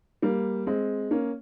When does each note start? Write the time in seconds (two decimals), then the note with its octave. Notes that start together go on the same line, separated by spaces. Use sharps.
0.22 G3 A#3
0.67 G#3 C4
1.11 A#3 C#4